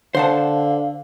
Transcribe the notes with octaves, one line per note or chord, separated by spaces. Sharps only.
D3 C5 F5 F#5 A5